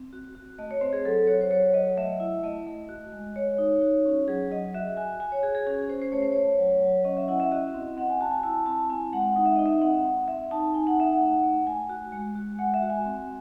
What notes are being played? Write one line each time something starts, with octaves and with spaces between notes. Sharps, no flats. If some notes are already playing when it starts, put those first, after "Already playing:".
Already playing: C4
F#4
F#4
A3 D#5
C#5
C4 C5
G#4
F#3 A4
F#4 C#5
C5
F#3 C#5
F#3 D#5
A3 E5
E4
A3 D#5
A3
F#4
G#3
F#4 C#5
D#4
F#4
C#4
F#3 G#4
F#3 D#5
F#4 E5
F#4 G#5
F#4 G#5
C#5
F#4 G#4
G#4
C#4 G#4
C#4 C5
C5
A3 C#5
C5
A3 C#5
F#3
F#3
C#4 D#5
E5
E4 F#5
E5
F#4 D#5
C4
C4 F#5
G#5
F#4 A5
G#5
E4 A5
C4 A5
C4 G#5
G#3 F#5
D#4 F#5
E5
D#4 D#5
E5
C4 F#5
C4
C4 E5
D#4 A5
D#4 G#5
F#5
D#4 E5
F#5
A3
A3
A3 G#5
F#4
G#3
F#4
G#3 F#5
E5
F#4
G#5
C4